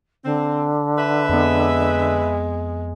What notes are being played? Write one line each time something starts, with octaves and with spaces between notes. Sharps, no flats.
D3 C4
B4 E5
F2 G#3 B3